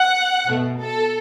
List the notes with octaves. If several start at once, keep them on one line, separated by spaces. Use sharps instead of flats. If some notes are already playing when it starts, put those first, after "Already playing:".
Already playing: F#5
B2 A3
A4